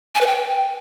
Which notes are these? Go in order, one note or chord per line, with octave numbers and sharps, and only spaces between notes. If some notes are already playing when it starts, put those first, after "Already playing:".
G#5
B4
G5